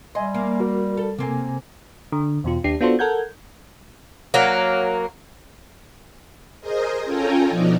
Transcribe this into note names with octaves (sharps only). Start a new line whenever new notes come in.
G3 D#5 E5 G#5 C6
A#3
F#4 A#4 D5
A4
C3 A#3 C4 G#5
D3
E2 B2 F4
D#2 D4 G4 C7
B3 D4 F4 F#4 A4 C5
A4 A#4 F#5 G6 G#6
F#3 A#3
G#4 A#4 C5 D#5
C#4 F4 A4 G5 G#5 A#5
B2 F3 D4 D#4